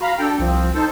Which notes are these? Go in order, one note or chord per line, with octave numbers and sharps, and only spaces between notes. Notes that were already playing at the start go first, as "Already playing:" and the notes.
F#4 F5 A#5 B5
D4 A4 G5
C2 F3 C4
D#4 A4 C5